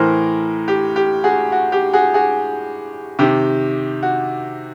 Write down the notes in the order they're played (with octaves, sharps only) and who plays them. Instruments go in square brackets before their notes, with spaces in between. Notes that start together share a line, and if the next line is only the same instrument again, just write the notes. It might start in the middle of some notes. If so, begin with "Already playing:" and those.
Already playing: [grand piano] A2 E3 A#4 C5
G4
G4
F#4 G#4
F#4
G4
F#4 G#4
F#4 G#4
C3 D#3 G4
F#4